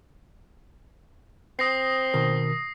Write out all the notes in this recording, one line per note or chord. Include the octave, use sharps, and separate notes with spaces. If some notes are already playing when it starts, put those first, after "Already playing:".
C4 D#6 A#6 C7
B2 D#3 A#4